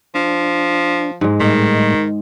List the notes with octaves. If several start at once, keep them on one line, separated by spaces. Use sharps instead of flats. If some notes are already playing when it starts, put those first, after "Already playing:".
F3 D4
G#2 G#3
A2 D#3 G3 A3